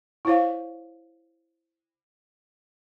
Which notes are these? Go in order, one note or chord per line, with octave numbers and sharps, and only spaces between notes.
E4 F4 C5 C#5 F5